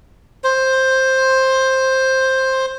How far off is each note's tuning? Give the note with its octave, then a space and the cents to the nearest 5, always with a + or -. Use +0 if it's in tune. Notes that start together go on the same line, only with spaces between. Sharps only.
C5 +10